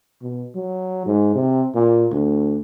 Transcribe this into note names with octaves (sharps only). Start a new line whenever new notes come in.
B2
F#3
G#2
C3
A#2
D2